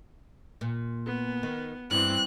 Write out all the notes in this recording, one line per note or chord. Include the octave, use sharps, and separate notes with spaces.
A#2
B3
D#3
G2 E3 C4 F#6